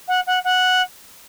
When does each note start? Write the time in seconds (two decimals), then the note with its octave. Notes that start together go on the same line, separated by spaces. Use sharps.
0.08 F#5
0.27 F#5
0.45 F#5